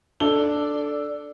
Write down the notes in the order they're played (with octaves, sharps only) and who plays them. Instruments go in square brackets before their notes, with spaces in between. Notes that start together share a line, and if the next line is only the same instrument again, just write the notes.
[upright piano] D4 A4 G7 [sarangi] D5